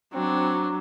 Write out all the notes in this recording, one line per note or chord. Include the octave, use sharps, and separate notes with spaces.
F#3 C4 D4